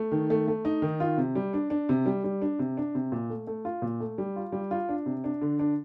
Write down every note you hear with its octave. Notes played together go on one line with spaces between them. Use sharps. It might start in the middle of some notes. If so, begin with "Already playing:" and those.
Already playing: A3
D#3
A3
A3
D#4
D#3
F4
C3
G3
D4
D4
C3
G3
G3
D4
C3
D4
C3
A#2
A3
A3
F4
A#2
A3
G3
F4
G3
F4
D4
C3
D4
D3
D4